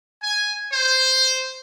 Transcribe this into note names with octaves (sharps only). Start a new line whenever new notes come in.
G#5
C5